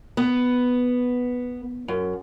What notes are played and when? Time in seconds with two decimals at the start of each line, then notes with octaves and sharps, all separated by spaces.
0.17 B3
1.88 F#2